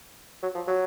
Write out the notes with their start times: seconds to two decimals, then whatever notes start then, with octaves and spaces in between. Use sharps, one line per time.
0.43 F#3
0.55 F3
0.67 F#3